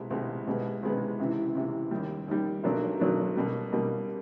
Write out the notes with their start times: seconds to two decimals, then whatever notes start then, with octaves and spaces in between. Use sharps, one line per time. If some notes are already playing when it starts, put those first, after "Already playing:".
Already playing: C2 B2 G#3
0.10 C2 B2 G#3
0.47 C2 B2 G#3 B3
0.83 C2 B2 G#3 B3
1.19 C#2 C3 E3
1.55 C#2 C3 E3
1.91 D#2 D#3 G3
2.28 D#2 D#3 G3
2.64 B1 B2 F#3 A#3 D4
3.00 B1 B2 F#3 A#3 D4
3.36 B2 G3 A#3
3.72 B2 G3 A#3